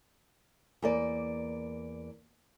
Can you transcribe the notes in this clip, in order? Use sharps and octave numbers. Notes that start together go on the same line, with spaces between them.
E2 A#3 D5